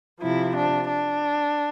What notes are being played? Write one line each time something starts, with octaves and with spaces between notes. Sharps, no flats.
C3 F3 E4
D4
D4